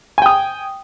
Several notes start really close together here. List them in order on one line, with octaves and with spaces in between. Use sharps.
G#5 G5 D#6